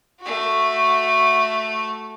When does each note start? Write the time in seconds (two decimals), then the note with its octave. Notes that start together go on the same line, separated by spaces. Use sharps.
0.21 A3 F#4